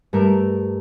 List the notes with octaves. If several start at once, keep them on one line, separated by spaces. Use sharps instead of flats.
G2 A3 A#4 D7